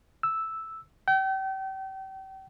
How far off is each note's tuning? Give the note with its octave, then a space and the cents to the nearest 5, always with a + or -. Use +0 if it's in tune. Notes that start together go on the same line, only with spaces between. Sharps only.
E6 -5
G5 -35